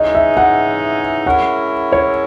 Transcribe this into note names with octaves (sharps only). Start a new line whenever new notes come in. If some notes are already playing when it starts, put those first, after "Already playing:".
Already playing: C#3 E3 G#3 D#4 D#5
E5
F#5
G#3 C#4 E4 A#4 F#5
C#5